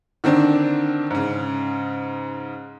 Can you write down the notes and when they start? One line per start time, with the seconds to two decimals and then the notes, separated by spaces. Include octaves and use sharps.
0.24 D3 D#3 C4 D4
1.11 G#2 C#3